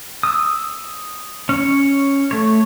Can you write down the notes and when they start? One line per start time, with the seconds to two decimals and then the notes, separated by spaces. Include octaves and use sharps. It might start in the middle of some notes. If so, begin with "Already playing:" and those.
0.23 D#6 E6
1.49 C#4 C#5
2.31 A3 C#5